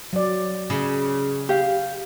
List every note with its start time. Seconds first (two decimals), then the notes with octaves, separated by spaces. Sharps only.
0.13 F#3 D5
0.70 C#3
1.49 G4 F5